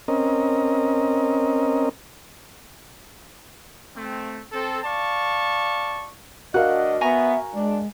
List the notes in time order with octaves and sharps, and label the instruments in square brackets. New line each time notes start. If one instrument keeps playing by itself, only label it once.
[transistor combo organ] C4 C#4 A#4 D#5
[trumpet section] A3 C4
C4 A4
D5 F5 A5 C#6
[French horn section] D2 D4 D#5 [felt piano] F#4 A#4 F5 [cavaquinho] F#5
[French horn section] B3 [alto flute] E5 [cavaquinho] G#5 A#5 C#6
[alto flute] G#3 [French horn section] D4